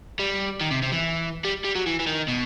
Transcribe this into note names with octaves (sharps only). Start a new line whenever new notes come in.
G3
D#3
C3
C3
E3
G3
G3
F#3
E3
E3
D#3
B2